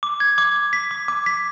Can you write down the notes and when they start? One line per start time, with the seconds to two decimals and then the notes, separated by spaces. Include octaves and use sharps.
0.03 D6
0.20 G#6
0.38 D6
0.56 D6
0.73 B6
0.91 D6
1.08 D6
1.26 B6